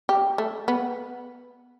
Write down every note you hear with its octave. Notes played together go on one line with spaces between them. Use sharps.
G4
A3
B3